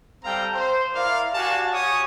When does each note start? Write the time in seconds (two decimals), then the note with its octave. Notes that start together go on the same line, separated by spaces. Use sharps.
0.24 G3 C4 A4 F5 G5 A#5
0.55 C5
0.94 E4 A#4 D5 F5
1.34 F#4 G4 D5 F5 G#5 A5
1.73 G4 C#5 G#5 C#6 D#6